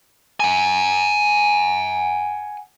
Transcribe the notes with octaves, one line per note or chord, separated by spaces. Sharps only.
F#5 G#5